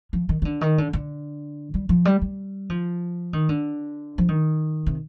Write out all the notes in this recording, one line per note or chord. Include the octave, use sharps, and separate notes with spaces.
F3
D#3
D#3
D3
D#3
D3
D3
G3
F3
G3
G3
F3
D#3
D3
F3
D#3
C3